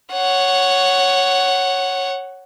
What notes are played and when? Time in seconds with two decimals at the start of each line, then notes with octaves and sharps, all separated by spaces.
0.13 C#5 F#5